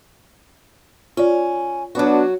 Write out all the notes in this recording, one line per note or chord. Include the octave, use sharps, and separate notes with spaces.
C#4 F4 D5
F#3 B3 D4 F#4